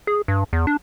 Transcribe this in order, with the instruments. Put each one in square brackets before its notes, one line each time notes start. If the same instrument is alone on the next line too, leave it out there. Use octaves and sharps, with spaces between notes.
[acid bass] G#4
G2
E2
D4